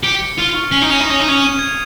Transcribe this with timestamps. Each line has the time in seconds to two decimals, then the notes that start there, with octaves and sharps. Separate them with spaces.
0.04 G4 C#7
0.21 C#7
0.38 F4 F6
0.55 C#6
0.72 C#4 C7
0.82 D#4
0.90 C#4 F7
1.01 D#4
1.07 C#4 D#6
1.20 D#4
1.25 C#4 D#7
1.42 F7
1.59 G#6